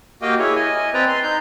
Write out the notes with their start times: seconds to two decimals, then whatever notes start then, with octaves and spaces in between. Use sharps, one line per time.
0.22 A#3 F#4 G4 D#5 F5 G5
0.39 E4 G#4 C#5
0.56 D#5 G#5
0.94 C4 B4 D5 G5 A#5
1.08 C6
1.23 D#4 G6